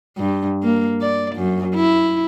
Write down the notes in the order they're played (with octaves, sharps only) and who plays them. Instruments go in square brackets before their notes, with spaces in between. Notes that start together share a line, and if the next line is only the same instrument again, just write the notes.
[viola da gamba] G2
A#3
D5
F#2
E4